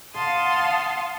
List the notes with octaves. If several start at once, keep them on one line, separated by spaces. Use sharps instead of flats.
F5 F#5 A5 C6 D#6